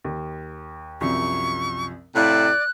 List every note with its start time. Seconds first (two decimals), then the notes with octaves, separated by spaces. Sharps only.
0.04 D#2
1.01 C2 F#2 F3 C#6
2.15 A2 C3 E4 D5 F5 F#6